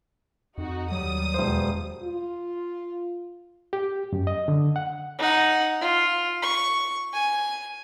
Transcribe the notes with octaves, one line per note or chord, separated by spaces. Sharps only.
F2 D#4 F#4
D#2 F#3 G3 D#6
E1 C5
F4
G4
F#2
D#5
D3
F#5
D#4 F#5
F4
C#6
G#5